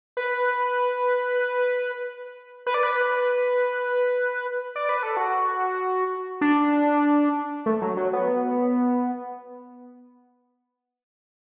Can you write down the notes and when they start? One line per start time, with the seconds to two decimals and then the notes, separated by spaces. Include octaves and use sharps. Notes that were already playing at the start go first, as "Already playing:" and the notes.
0.17 B4
2.67 B4
2.74 D5
2.83 B4
4.76 D5
4.89 B4
5.03 A4
5.17 F#4
6.41 D4
7.66 A3
7.82 F#3
7.97 F#3
8.13 B3